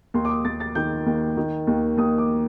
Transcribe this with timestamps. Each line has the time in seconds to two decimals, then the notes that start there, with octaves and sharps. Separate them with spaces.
0.14 D#2 C6
0.25 D6
0.29 D#6
0.45 D#2 A6
0.60 A6
0.75 D#3 G6
1.06 D#2
1.37 D#3
1.67 D#2
1.97 D#2 D#6
2.18 D6